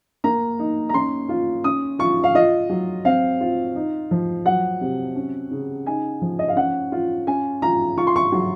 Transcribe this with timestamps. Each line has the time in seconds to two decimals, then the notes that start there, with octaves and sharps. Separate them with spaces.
0.24 A#3 A#5
0.59 D#4
0.89 A#5
0.94 C#4 C6
1.29 F4
1.64 C#4 D#6
1.99 F4 C#6
2.24 F5
2.35 F4 D#5
2.70 F#3
3.05 C4 F5
3.41 F4
3.75 D#4
4.11 F3
4.45 F#3 F#5
4.81 C3
5.16 C#4
5.51 C#3
5.86 D#4 G#5
6.22 F3
6.39 D#5
6.48 F5
6.56 C#4 F#5
6.92 F4
7.27 C#4 G#5
7.62 F4 A#5
7.97 F4 C#6
8.07 C6
8.16 C#6
8.32 F#3